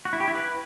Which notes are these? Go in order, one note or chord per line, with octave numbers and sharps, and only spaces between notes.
F#4
E4
G4
E4
B4